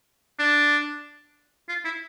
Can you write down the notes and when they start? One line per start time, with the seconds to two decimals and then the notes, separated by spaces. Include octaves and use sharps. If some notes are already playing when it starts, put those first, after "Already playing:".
0.39 D4
1.69 F4
1.85 E4